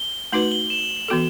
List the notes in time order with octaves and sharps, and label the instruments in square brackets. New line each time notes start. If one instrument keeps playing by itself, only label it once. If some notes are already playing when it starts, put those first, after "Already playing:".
Already playing: [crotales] G7
[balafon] A3 D#4 F#4 B4 [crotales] F#7
[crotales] G7
E7
[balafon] E3 B3 F#4 A4